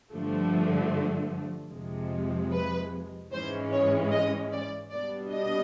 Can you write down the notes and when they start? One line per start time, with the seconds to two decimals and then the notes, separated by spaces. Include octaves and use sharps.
0.11 G2 D3 F3 A3
1.71 F2 C3 F3 G#3
2.51 B4
3.32 G#2 E3 G#3 C#4 C5
3.71 C#5
4.11 D#5
4.52 D5
4.92 B2 G3 B3 D4 D5
5.32 D#5